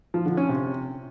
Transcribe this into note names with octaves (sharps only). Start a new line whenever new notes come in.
F3
D3
C#4
C3